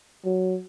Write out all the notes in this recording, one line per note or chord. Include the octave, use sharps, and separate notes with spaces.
F#3